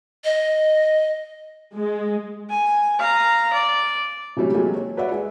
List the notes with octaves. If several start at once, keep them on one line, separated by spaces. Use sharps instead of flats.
D#5
G#3
G#5
F5 A#5
D5
C3 E3 F#3 G3 A3 C#4
F#3 G#3 A#3 G4 A4
C#5
F#4 B4 C#5 D5 E5 F#5
G#3